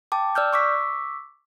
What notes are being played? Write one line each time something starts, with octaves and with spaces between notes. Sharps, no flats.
G5 A5 D6
D5 E6 F6 G6
C#6 D6 E6 B6